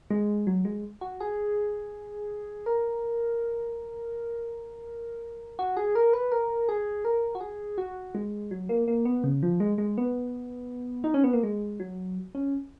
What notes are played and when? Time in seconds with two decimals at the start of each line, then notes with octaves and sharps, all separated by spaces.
0.10 G#3
0.47 F#3
0.65 G#3
1.01 F#4
1.20 G#4
2.66 A#4
5.59 F#4
5.77 G#4
5.95 A#4
6.13 B4
6.32 A#4
6.69 G#4
7.05 A#4
7.35 F#4
7.41 G#4
7.78 F#4
8.15 G#3
8.51 F#3
8.69 A#3
8.88 A#3
9.05 B3
9.24 C#3
9.43 F3
9.60 G#3
9.78 G#3
9.98 B3
11.04 D#4
11.14 C#4
11.24 B3
11.33 A#3
11.43 G#3
11.80 F#3
12.35 C#4